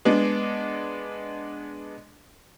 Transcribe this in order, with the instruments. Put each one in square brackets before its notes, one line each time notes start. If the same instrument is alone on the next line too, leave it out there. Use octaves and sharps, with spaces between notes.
[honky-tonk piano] G#3 B3 D4